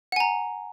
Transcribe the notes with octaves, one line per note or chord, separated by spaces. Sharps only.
F#5 G#5 A#5